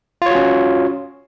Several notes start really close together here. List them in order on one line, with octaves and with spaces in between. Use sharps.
F4 C#5 F#4 C#4